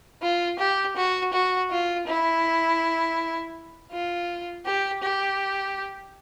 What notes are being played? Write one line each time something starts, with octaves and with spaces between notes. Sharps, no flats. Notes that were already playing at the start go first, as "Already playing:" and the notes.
F4
G4
F#4
F#4
F4
E4
F4
G4
G4